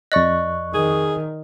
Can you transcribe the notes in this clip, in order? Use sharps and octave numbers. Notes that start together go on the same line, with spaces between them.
F2 D5 D#5 C#6 F#6
D#3 G#4